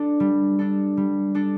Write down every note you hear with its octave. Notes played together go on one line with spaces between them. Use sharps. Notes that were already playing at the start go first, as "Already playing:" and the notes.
Already playing: D4 A4
G3
D4 A4
G3
D4 A4